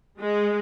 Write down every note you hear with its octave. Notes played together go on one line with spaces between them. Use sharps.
G#3